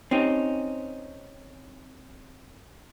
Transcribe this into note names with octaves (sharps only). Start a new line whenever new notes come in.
C4 C#4 D#4 G4